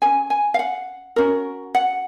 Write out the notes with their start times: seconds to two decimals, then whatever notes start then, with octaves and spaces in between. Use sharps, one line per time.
0.02 G#4 G#5
0.05 C#4
0.30 G#5
0.54 F5
0.59 F#5
1.16 C#4 F#4 A#4
1.75 F#5